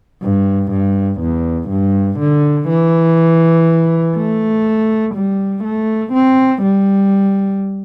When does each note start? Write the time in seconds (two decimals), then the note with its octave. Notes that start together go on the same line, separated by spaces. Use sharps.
0.23 G2
0.72 G2
1.21 E2
1.70 G2
2.20 D3
2.69 E3
4.16 A3
5.15 G3
5.64 A3
6.13 C4
6.63 G3